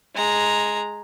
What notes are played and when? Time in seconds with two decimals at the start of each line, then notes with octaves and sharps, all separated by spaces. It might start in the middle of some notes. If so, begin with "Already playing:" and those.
0.15 G#3 A#5